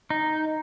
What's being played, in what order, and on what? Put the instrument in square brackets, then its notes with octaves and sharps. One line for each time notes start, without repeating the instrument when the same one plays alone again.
[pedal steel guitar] D#4